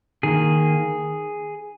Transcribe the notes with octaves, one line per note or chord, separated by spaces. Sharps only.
D#3 A#3 G#4